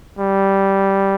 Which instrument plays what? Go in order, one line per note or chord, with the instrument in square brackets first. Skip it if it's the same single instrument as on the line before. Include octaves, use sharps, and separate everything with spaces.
[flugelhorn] G3